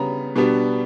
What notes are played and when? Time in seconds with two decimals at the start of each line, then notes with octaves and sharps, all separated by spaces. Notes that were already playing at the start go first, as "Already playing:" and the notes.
Already playing: C#3 G3 B3 A#5 B5
0.36 B2 G3 B3 D4